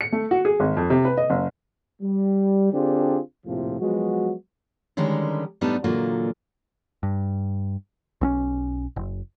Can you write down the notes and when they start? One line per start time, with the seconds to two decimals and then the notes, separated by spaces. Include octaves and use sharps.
0.01 C#7
0.12 A3
0.31 F#4
0.45 G#4
0.60 G#1
0.77 F2
0.90 C3
1.05 B4
1.17 D#5
1.30 F#1
2.02 G3
2.73 D3 C4 D4 F4 G4 G#4
3.46 A#1 F2 A2 C3 F3
3.80 F3 F#3 G#3 B3 F#4
4.97 D3 D#3 G3 G#3 C#4 A#4
5.61 A2 G3 B3 D4 D#4 A5
5.84 A#2 D3 E3 F#3 A#3 F4
7.03 G2
8.21 B1 C4 C#4
8.96 F#1